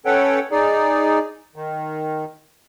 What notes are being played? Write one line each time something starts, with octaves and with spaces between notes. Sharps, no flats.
C#4 A4 B4 C#5 F#5 G5
D#4 G#4 D5
D#3